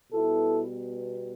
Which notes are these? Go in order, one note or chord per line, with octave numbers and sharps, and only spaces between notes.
B2 G3 B3 E4 A4